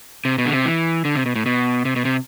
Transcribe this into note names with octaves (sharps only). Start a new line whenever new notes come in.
C3
B2
D3
C3
E3
D3
C3
B2
A2
B2
C3
B2
C3